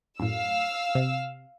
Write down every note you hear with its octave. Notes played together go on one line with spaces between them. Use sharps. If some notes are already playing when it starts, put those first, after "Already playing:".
F#2 A2 F5 E6
C3